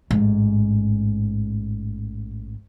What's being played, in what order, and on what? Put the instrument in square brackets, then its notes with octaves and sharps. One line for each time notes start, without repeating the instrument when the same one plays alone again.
[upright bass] A1 G#2